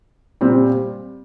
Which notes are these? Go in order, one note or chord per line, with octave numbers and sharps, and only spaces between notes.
A#2 G3 C4